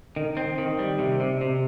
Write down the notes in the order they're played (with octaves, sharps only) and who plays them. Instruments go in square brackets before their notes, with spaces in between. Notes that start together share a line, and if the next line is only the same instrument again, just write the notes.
[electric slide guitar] D#3
C4
D#3
G3
C3
C3
C3